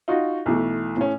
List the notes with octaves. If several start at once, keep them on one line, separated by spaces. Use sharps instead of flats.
D#4 F4 F#4
B1 E3 A3
A2 C#4